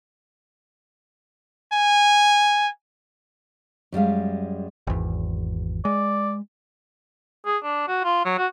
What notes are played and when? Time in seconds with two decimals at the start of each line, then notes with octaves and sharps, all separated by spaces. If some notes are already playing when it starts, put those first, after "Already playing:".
1.73 G#5
3.92 F#2 G3 G#3 F5
4.87 G#1 E2
5.85 G#3 D5
7.46 G#4
7.63 D4
7.88 F#4
8.04 F4
8.25 F#3
8.38 F#4